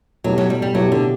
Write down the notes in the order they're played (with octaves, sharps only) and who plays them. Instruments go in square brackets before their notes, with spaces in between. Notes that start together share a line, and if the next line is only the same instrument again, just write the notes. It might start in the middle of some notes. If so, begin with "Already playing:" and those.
[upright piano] B2 A3 E4 G4 [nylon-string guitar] F#3
[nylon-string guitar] F#3
G3
G3
[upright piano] B2 A3 E4 G4 [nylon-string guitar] F#3
[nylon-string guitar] D3